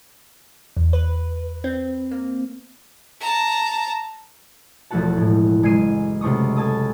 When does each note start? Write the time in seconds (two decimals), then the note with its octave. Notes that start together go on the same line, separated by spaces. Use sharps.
0.77 E2
0.93 B4
1.64 C4
2.11 A#3
3.21 A5 A#5
4.91 E1 F3 A3 F#4 F#5 A5
5.17 A2 G#3
5.63 F#1 G#3 G#6 C7 D#7 E7
6.21 C#2 C3 A3 C#6 D#6
6.56 A4 G#5 A5 D#6